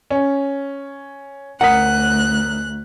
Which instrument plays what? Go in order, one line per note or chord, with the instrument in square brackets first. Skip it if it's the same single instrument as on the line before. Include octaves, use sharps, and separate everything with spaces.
[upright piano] C#4
[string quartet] D2 F#6 [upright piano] A#4 D#6 B6 [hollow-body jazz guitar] F#5